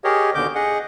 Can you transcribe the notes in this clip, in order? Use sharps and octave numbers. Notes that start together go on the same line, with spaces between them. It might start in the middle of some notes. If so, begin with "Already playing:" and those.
G4 G#4 A#4 C#5 D#5
D#2 B2 D3 D6 G6
G#4 D#5 F#5